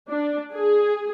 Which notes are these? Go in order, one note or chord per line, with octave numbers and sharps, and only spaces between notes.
D4
G#4